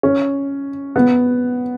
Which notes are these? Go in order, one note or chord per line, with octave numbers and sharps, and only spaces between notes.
C#4
B3